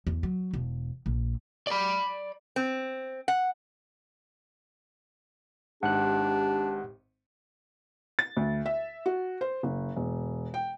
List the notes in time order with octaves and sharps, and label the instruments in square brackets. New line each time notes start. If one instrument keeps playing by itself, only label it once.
[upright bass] E2
F#3
E1
A#1
[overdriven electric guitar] D5 B5
[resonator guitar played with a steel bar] C4
F#5
[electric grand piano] G#1 G#2 [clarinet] D4 [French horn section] G4 [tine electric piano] F#5 F#6
[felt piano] A6
D2
E5
F#4
C5
F#1
E1
G5